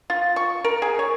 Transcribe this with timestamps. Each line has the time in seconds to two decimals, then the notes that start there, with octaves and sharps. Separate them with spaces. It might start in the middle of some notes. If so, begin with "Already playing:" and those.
0.10 F4
0.36 C#6
0.64 A#4
0.82 G#4
0.99 C#5